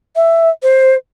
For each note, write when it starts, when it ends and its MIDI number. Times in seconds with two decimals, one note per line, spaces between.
0.16 0.50 76
0.63 0.95 72